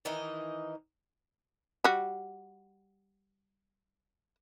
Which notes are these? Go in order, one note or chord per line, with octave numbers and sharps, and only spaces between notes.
D#3 E3 D#4 D#5
G3 F#4